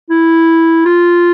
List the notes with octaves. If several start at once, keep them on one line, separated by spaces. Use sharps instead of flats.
E4
F4